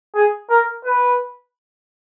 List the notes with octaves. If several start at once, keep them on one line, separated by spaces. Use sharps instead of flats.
G#4
A#4
B4